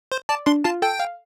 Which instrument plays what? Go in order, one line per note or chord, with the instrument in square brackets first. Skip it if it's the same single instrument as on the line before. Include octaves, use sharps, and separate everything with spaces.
[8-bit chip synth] C5
[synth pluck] D5 [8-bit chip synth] A5
[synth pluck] D4 [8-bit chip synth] C6
[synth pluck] F4 [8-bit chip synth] A5
[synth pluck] A4 [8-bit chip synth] G5
[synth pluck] F5